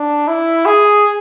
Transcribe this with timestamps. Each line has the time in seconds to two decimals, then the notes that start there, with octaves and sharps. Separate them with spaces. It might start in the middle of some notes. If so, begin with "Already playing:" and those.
Already playing: D4
0.28 E4
0.66 G#4